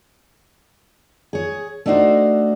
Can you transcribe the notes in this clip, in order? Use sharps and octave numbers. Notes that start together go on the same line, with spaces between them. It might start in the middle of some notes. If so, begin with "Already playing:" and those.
G#4 C#5
A3 D4 D#4 F#4 C5